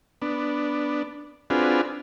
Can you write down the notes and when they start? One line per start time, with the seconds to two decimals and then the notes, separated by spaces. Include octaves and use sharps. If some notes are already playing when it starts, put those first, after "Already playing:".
0.22 B3 D4
1.50 C4 D4 F4 F#4 G#4 B4